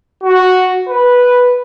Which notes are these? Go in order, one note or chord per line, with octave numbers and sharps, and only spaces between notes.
F#4
B4